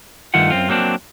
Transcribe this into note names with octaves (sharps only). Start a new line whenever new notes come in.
G2 D#3 A3 F4 F#5
F#2 C4 F4
F#3 A#3 C4 D4